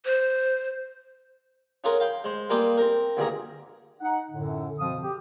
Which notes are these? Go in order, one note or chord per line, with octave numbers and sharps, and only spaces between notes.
C5
C#4 F4 G#4 A#4 F#5 G#5
F5 G5 B5
G#3 C5
G3 A#3 F4 G#4 B4 G5
C4 A#4
D2 G2 A#2 G#4 A#5
D#4 F#5
F#2 A2 D3
B2 F3 C4 F5 D#6
G4